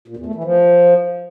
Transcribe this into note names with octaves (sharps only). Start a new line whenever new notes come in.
A#2
E2
A3
E3
F3